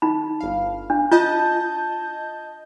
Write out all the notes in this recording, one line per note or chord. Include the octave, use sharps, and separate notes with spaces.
D#4 B5
G1 F5
D4
F4 D#5 A5 G6